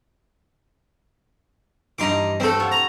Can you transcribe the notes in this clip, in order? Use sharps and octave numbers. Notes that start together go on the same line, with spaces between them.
G2 E3 D#4 C6 D6
G2 A3 C4 A4
F4 C#5 F#5
A#5